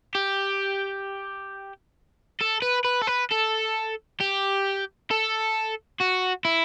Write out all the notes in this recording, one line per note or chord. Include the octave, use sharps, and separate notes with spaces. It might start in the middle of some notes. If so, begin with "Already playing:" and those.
G4
A4
B4
B4
A4
B4
A4
G4
A4
F#4
E4